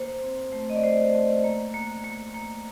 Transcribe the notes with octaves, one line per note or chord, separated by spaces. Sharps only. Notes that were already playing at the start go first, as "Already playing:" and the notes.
Already playing: A#3 C5
C4
A3
D#5
D5
A3 C5
A3
A#3
A#3
A#3
A#3